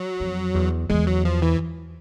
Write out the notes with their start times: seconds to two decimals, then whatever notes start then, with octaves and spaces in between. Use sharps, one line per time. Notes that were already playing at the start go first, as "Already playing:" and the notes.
Already playing: F#3
0.20 F2
0.54 E2
0.89 E2 G#3
1.07 F#3
1.25 F3
1.42 E3